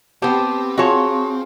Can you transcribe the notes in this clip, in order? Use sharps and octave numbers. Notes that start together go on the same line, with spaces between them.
B3 C4 G4 C5 A5
F4 F#4 G#4 C#5 F5 A5